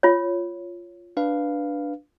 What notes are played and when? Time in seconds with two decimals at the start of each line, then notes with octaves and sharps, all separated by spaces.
0.03 F4 C#5
1.17 D4 B4 F5